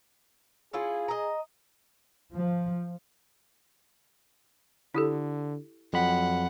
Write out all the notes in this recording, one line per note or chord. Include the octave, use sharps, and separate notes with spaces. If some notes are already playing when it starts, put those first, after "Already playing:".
C#4 E4 F4 G#4
D#5 A#5
F3
D3 E4 G4 A4
F2 F#3 F#5 B5